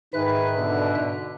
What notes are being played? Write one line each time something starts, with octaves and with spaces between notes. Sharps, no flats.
G#2 D#3 G#4 B4 E5 F#6
B2 D3